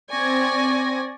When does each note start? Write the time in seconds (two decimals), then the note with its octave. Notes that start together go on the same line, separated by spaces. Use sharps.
0.11 C4 D5 G#5 C#6 G#6 A#6